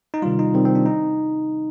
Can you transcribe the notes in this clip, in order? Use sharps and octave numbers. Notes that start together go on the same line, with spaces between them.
D#4
C3 D#3 G3 F4
D#4
C3 D#3 G3 C4
C4
D4
D#4